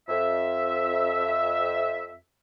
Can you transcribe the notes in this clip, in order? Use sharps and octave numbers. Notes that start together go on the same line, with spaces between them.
F2 E5